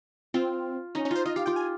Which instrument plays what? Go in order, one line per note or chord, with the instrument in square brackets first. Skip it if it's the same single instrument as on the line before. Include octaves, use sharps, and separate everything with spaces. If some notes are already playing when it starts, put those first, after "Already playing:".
[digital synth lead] C4 [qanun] F4
[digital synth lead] C#4 [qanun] D#4
[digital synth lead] C#4
[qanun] F4 [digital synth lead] C5
[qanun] F4 [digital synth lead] D#5
[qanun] G4 [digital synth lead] F5
[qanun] F4 [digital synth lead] G5
[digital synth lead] G#5